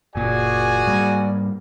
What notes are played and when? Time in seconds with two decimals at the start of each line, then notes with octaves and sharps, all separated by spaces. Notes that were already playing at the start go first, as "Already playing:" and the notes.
0.16 F#1 A#2 F#4 G#4 D5 G#5
0.86 G#2 G3 A#3